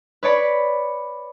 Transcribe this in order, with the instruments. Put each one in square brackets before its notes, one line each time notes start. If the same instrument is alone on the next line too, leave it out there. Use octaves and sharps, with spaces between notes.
[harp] B4 C#5 D5 B5